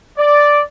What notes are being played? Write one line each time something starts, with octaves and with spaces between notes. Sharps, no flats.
D5